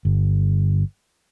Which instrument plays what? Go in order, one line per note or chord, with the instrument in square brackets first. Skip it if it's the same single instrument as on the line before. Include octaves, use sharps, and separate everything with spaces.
[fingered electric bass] G1